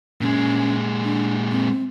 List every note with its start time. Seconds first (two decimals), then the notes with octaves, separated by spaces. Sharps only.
0.21 A#2 G#3 C#4
1.04 D4
1.51 C4